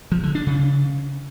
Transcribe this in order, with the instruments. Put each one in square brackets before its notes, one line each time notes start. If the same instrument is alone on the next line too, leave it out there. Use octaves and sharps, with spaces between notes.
[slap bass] F3
D3
D4
C#3